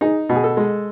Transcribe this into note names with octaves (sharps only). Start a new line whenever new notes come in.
D#4 G#4
B2
G#4
A4
G#3